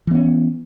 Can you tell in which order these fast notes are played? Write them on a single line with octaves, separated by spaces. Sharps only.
E3 B3 C#4